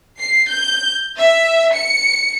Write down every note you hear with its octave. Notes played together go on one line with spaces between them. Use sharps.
C7
G6
E5
C#7